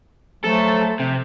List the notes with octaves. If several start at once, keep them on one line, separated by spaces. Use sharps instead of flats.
F3 F#3 A3 A4
C3